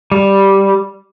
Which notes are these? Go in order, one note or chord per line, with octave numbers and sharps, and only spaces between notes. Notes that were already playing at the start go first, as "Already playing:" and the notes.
G3